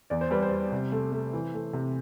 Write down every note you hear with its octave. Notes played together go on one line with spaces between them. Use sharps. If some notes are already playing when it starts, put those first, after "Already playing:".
E2 D5
C5
G3 B4
C5
G3
C3
A3
A3
E3
A3
C3